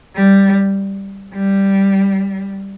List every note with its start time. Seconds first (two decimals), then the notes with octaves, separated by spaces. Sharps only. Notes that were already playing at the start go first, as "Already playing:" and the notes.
0.16 G3
1.34 G3